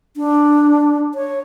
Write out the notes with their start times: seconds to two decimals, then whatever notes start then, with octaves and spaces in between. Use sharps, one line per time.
0.17 D4
1.15 C#5